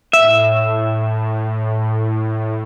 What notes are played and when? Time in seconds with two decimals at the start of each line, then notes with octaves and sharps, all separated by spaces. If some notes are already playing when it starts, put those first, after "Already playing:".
0.13 A2 E5